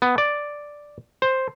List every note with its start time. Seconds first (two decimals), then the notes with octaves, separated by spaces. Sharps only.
0.02 B3
0.18 D5
1.22 C5